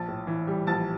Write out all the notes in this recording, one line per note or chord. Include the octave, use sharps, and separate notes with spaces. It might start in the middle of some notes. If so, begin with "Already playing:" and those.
Already playing: A#1 A5 A6
A2
E3
G3
A#1 A5 A6